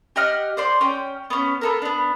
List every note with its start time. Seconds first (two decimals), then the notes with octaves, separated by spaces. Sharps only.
0.16 G4 D#5 F#5 F6
0.57 C5 D5 C6
0.81 C#4 G5
1.30 B3 C#4
1.61 B3 A4 A#4
1.82 B3 D4